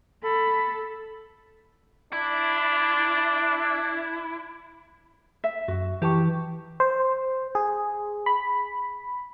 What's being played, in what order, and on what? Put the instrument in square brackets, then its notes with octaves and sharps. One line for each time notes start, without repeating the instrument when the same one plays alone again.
[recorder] A4 [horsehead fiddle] B5
[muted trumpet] D4 [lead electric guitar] E4
[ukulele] E5
[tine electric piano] F#2 [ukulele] F#4
[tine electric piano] E3 C#6 [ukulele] G4 A5
[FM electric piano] C5
G#4
B5